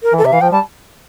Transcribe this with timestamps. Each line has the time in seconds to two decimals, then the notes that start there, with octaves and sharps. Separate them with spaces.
0.03 A#4
0.13 E3
0.18 C3 A4
0.25 E5
0.32 E3 F5
0.41 F3 G5
0.52 G3 A5